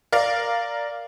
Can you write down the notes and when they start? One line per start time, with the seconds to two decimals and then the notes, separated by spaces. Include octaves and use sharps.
0.12 A#4 D5 F5